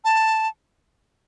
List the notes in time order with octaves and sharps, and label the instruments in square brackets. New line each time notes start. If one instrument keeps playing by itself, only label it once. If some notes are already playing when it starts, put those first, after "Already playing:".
[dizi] A5